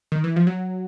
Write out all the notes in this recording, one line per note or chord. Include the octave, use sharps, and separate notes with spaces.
D#3
E3
F3
F#3